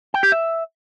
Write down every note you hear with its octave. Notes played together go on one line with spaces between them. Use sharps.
G5
G4
E5